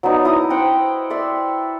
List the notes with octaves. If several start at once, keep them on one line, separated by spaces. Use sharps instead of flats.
F#3 B3 D4 D#4
E4 D#5 A#5 D#6
C5 F#5 G5 A#5
D5 E5 C6